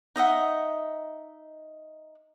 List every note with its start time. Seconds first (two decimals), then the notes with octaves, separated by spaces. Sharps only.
0.16 D#4 D#5 E5 F#5